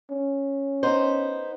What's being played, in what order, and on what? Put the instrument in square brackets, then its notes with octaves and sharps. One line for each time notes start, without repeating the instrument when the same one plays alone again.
[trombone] C#4
[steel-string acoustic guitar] B3 D#4 C5